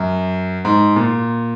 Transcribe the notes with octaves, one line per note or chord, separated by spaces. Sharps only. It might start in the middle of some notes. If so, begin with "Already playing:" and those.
Already playing: F#2
G#2
A#2